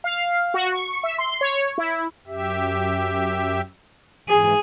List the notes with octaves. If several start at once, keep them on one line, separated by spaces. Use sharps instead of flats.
F5
F#4
C#6
E5
C6
C#5
E4
F#2 G4 E5
G#2 E3 G#4